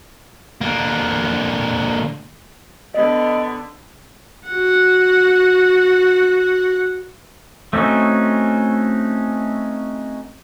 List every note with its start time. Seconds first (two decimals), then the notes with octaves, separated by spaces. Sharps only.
0.61 D3 A#3
2.94 D3 B3 D#5
4.48 F#4 F#5
7.73 A3 C4 C#4 D#4 F#4